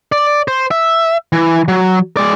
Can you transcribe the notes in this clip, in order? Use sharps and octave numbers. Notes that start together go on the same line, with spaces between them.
D5
C5
E5
E3
F#3
G#3 D5